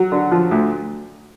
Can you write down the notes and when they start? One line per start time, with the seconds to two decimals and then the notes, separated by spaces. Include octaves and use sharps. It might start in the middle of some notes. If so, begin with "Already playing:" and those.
Already playing: F#3
0.12 D3
0.32 F3
0.51 D2